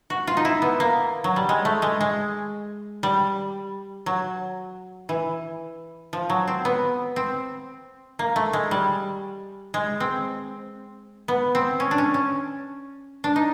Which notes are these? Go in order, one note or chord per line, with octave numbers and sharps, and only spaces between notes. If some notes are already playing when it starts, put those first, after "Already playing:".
F#4
F4
D#4
E4
B3
A#3
F#3
G3
G#3
A3
G#3
G#3
G3
F#3
E3
F3
F#3
C4
B3
C4
A#3
A3
G#3
G3
G#3
C4
B3
C4
C#4
D4
C#4
C#4
D4
D#4